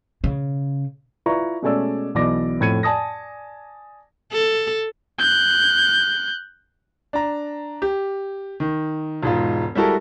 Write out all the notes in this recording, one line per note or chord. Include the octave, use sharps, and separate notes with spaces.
C#3
E4 F4 B4 D5 A#5 C#6
B2 G#3 A3 C#4 D5 E6
B1 E3 D5 D6 A#6
F2 A2 F3 G#6 C#7 D#7
D5 G#5 A5 D#6 A#6
A4
F#6 G6
D4 A#5
G4
D#3
E1 G#2 F4
G3 G#3 E4 F#4 A4 A#4